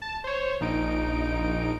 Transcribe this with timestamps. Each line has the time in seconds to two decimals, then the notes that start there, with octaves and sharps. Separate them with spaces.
0.02 A5
0.24 C5 C#5
0.61 A#1 D#4 D7